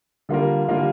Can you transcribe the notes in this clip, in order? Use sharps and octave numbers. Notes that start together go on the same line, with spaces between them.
D3 G3 A#3 F4 A#4
D3 G3 A#3 F4 A#4